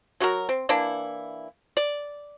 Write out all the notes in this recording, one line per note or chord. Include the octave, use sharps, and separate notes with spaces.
F#3 F#4 G4 A#4
C4
E3 A#3 D4 E4
D5